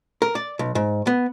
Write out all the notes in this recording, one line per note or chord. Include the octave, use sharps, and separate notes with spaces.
A#4
D5
B1
G#2
B3